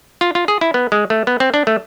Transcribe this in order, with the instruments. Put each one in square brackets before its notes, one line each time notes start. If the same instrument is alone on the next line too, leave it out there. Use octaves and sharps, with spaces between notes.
[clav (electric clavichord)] F4
F4
G#4
E4
B3
G#3
A3
B3
C4
D4
A3